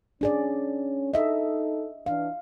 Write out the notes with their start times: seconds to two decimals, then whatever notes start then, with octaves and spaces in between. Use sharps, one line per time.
0.21 C#4 D4 G#4 D5
1.14 D#4 A4 D#5 E5
2.06 E3 D4 F5